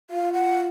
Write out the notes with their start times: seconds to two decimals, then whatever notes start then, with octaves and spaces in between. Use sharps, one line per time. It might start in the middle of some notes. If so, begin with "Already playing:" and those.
0.10 F4 F5
0.33 F#5